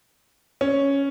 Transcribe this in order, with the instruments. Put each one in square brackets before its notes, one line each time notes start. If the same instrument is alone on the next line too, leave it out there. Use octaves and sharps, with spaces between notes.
[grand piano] C#4